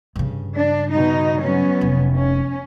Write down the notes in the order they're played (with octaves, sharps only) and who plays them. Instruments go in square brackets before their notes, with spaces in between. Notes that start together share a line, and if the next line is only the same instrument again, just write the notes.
[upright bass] G2 C#3
[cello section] D4
B2 D#4
F#3 B3 C#4
[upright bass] F1
[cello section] C#4